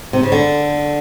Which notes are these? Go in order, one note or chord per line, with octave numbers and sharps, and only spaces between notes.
C3
C#3
D3